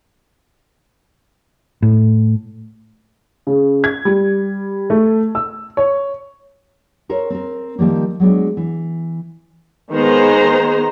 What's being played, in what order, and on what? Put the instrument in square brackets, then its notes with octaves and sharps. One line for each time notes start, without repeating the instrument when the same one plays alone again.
[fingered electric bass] A2
[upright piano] C#3
G#6
G3
A3
E6
C#5
[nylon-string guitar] A4 A#4 C5 C#5
C4 A#4
D#3 F3 G3 A#3
F#3 G#3 B3 D4
E3
[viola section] D#3 G#3 B3 G#4 C5 A#5